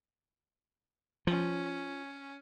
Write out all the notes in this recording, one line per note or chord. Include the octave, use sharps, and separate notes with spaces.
F3 C#4